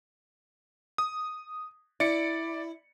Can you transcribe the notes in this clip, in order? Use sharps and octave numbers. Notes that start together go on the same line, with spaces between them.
D#6
E4 D5 C#7